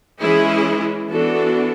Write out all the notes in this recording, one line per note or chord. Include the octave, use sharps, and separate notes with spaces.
E3 G#3 C#4 E4 G#4
E3 B3 D4 F#4 A4